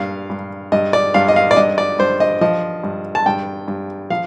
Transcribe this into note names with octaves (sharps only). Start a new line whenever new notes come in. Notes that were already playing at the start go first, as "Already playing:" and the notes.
Already playing: G2 A#2 F5
G2
G2 D#5
D5
G2 F5
D#5
F5
D5
G2 D#5
D5
G2 C5
D#5
F3 D#5
G2
A5
G2 G5
G2
F3 F5